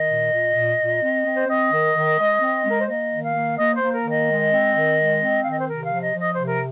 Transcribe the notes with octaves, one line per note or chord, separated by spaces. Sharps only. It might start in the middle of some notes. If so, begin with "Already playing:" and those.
Already playing: D#3 D#5
A#2
A#2
A#2
A#2
C4
C4
C5
C4 D#5
D#3
D#3
G#3
C4
G#3 A#4
C5
A#3 D#5
D#3
F5
A#3
A#3 D#5
C5
A#3
A#4
D#3
D#5
G#3
C4
D#3
G#3
C4
D#3 F5
D#5
C5
C3 A#4
F5
F3
D#5
F3
D#5
C3 C5
A#4